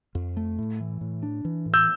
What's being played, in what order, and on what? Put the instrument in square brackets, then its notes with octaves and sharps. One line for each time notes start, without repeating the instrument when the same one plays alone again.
[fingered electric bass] F2
A3
A2
E3
A2
D4
E3
A2
[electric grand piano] E6 G6